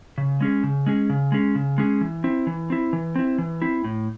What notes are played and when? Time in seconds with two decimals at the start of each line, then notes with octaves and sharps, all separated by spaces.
0.18 C#3
0.41 G#3 C#4 G#4
0.63 C#3
0.86 G#3 C#4 G#4
1.10 C#3
1.32 G#3 C#4 G#4
1.55 C#3
1.78 G#3 C#4 G#4
2.01 E3
2.24 C4 E4
2.47 E3
2.70 C4 E4
2.93 E3
3.16 C4 E4
3.38 E3
3.62 C4 E4
3.85 A2